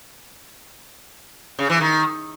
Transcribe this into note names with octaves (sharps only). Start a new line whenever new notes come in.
C#3
E3
D#3